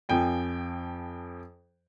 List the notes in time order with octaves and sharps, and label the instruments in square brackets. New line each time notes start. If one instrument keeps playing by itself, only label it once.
[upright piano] F2 F3 G5 G#5